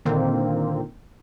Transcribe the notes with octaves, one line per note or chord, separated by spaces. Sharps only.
A#2 D3 D#3 A#3 C4